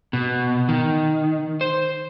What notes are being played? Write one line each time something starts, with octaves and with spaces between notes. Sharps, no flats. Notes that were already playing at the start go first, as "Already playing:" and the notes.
B2
D#3
C5